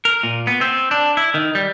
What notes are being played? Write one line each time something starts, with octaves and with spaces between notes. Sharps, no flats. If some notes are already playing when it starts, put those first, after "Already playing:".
A#4
A#2
B3
C4
D4
E4
D#3
G3